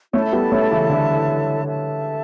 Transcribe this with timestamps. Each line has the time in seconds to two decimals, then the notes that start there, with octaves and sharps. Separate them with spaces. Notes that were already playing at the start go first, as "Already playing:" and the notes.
0.13 A3 C#4 E4 A4 E5 A5
0.32 G3 B3
0.52 A3 C#4
0.70 C#3 E3
0.89 D3
1.65 A4 E5 A5